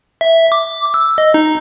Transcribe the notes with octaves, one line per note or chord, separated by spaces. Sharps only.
E5
D6
E6
D#5
D#4